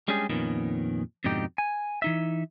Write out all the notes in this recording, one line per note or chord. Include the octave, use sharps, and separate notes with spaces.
G3 G#3 C#4 D4 G4 G#4
F2 A#2 D#3 B3 C#4
F2 G#2 B2 D3 D#4 G4
G#5
E3 D#4 E5